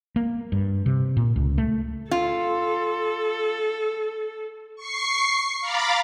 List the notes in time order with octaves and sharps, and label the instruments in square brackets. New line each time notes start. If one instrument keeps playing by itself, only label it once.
[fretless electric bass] A#3
G2
C3
A#2
C#2
A3
[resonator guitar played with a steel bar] F4 [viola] A4
[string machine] C#6 C7
F5 A#5 B5 D6 A6